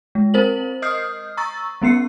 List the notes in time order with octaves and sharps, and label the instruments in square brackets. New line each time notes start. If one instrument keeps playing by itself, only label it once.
[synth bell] G#3
C4 A#4 C5 F#7
D#5 D#6 F6 G6 C7
A#5 C#6 E6 A6
G3 B3 C#4 C7 C#7